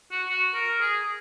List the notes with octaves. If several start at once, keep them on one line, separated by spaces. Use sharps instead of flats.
F#4
F#4
A#4
G#4